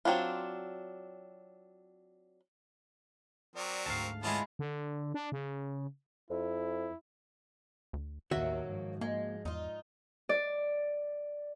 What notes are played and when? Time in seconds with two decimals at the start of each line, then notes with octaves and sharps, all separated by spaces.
0.05 F#3 C4 D4 F4
3.55 F#3 C4 A#4 D5
3.86 D2 G#2 F5 A5
4.23 G#3 B3 C#4 E4 F4 A5
4.59 D3
5.14 D4
5.32 C#3
6.30 F2 E4
7.93 D2
8.31 A1 D#2 D#3 F#3 A#3 F#4 E5
8.67 G#2 F3
9.01 G#3 A#3
9.45 E2 D#4 F4
10.29 D5